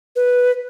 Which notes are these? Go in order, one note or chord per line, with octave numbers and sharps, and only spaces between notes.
B4